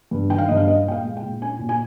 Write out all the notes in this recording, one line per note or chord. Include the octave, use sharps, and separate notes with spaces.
G2
D#3 G5
F5
G2 D#5
F5
C#4 D#5
A#2 G5
F5
G#3
G5
A#2
C#4 G#5
A#2
G#5